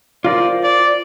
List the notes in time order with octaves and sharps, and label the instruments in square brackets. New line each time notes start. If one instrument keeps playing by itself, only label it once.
[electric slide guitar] F4 A#4 C5 [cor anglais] D5
[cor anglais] D5